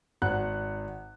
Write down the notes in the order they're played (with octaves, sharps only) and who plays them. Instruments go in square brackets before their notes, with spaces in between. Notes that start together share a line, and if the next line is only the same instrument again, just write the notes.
[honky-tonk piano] G#1 F#5 F#6